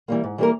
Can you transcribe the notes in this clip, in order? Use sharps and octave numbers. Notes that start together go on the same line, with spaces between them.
E3 G3 A#3
G#2
E3 G3 A#3 A#4